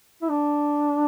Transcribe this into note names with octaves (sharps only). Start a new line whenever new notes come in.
E4
D4